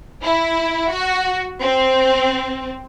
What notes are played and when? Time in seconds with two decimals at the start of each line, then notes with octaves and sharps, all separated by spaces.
0.23 E4
0.92 F#4
1.61 C4